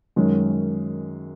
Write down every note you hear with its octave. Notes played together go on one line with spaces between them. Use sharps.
F#2 D#3 G#3 C#4